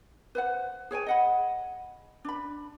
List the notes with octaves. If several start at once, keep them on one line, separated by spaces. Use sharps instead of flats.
B4 C5 F#5
G#4 C#5 G5 G#5
D#5 F#5 B5
D4 B5